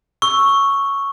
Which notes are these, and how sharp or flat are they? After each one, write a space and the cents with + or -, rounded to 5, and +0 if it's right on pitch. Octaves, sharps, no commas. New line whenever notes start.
C#6 +0 E6 +0